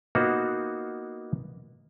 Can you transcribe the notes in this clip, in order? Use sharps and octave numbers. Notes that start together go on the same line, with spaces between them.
A#3 B3 D#4 F4 F#4 C5